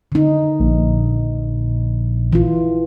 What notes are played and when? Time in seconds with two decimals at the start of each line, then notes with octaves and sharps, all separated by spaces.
0.12 D3 D#4
0.59 A#1
2.33 E3 F4